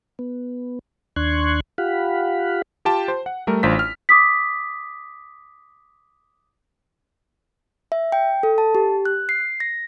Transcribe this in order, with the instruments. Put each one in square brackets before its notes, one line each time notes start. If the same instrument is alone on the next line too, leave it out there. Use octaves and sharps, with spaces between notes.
[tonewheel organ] B3
D#2 D4 C6 C#6 F#6 G#6
F4 G4 F5 F#5 B5
[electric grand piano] F4 G4 G5 A5
C5
F#5
G3 A3 A#4
A1 D4 F4 C5 B6
F6
[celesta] D6 D#6 B6
[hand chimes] E5
G5
A4
A5
G4
F#6
C7
A#6